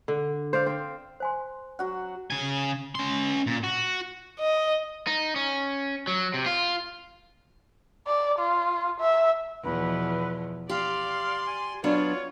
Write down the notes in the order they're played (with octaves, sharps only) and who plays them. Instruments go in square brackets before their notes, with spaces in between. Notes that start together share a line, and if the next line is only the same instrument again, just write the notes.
[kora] D3
C5 D5 F5
C4 C5
[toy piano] C5 G#5 C6
[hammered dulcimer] F#3 F#4 F#5
[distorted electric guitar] C#3 G#5
C#4 C6
A#2
F#4
[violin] D#5
[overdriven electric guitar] D#4
C#4
F#3
C3
F4
[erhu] D5
F4
E5
[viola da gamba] E2 B2 F3 [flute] B4
[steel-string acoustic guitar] G4 [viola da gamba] D5 [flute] F5 [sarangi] C6
[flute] G#5
[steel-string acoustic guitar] F#3 B3 D4 [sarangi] F4 [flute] C#5